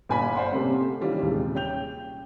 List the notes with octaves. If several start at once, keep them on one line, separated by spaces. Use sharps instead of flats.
G1 A#2 G#5 B5 B6
C5 D5 F#5 B5 C6
C3 A3 A#3 C4 C#4
D#3 E3 G3 C#4 F4
D#1 C3 G#3
C#4 G5 G6 F7